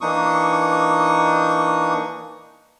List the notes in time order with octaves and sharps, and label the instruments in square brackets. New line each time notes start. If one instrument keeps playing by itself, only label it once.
[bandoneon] E3 A#3 D4 D#4 C#6 D#6